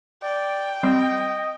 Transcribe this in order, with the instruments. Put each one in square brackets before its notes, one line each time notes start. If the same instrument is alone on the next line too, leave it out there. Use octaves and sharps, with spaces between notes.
[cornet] D5 [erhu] G5
[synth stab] G3 C4 [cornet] D#5